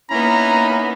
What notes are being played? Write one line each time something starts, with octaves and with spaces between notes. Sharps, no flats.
A#3 B3 C#4 D#4 E4 A#5 B5